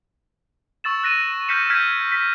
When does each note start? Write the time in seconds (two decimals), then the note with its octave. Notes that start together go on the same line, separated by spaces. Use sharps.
0.84 C#6 E6 A6 E7
1.03 F#6 A#6 D#7 E7
1.48 F6 G6 A#6 B6 C#7 E7
1.70 F6 G6 G#6 B6 D#7
2.12 B6